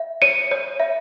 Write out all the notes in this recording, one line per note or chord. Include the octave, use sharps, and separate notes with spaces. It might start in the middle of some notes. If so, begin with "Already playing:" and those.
Already playing: E5
C#5 C#7 D#7
C#5
E5